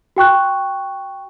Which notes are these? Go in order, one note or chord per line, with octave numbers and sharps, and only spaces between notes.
F#4 G5 C#6 F#6